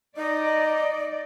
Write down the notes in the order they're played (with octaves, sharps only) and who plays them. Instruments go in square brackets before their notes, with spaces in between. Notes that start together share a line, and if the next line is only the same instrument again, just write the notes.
[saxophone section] D#4 [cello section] D5 [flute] D#5